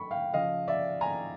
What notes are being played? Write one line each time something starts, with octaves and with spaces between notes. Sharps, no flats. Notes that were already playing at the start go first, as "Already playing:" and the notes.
Already playing: A2 F#3 B5 C#6
F5 G5
C#3 F3 D#5 F5
D5 E5
G#5 A#5